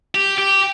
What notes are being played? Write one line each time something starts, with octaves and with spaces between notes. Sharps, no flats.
G4
G4